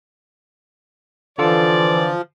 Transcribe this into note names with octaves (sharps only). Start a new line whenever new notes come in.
D3 E3 F3 F4 A4 D5